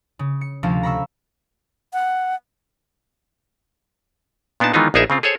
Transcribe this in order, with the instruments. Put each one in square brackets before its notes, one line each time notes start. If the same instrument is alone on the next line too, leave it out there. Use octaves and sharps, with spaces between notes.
[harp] C#3
C#7
D2 C3 F3 C#4 A4 F5
A#5 B5 C#6 E6
[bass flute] F#5
[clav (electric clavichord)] A#2 B3 D4 D#4 A5
D#3 E3 G#3 B3 D#4 F4
A#1 B3 D#4 G#4 A#4 E5
C#3 C4 F4
G#4 A4 C5 C#5